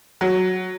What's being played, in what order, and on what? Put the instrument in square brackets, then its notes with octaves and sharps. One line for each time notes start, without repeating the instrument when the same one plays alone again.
[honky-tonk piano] F#3